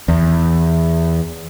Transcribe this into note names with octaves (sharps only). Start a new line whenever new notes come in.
E2